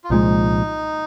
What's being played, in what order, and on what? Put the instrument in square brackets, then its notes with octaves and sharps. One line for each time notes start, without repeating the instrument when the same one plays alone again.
[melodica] F4
[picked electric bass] C2 A#2 F3 G#3 [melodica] D#4